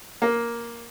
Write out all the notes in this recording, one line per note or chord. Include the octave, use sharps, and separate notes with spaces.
A#3